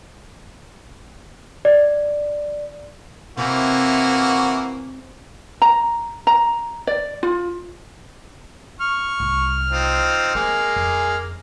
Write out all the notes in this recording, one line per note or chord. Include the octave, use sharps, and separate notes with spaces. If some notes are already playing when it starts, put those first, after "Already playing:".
D5
C3 E3 A#3 F#4
A#5
A#5
D5
F4
C#6 F6
C2
C4 D#4 F4
G#3 A#3 C4 G#4
F2